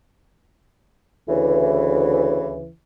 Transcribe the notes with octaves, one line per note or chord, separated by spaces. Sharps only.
D2 C#3 E3